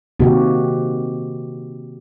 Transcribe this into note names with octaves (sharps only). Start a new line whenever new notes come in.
C3 D#3 A#3 F#4 G4